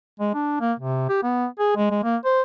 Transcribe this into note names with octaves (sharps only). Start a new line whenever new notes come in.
G#3
D4
A#3
C3
G4
B3
G#4
G#3
G#3
A#3
C5